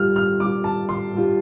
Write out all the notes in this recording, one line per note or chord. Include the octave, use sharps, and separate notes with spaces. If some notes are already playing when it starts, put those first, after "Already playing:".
Already playing: G2 G3 F4 F6
F6
G2 G3 F4 D6
A5
C6
G2 G3 F4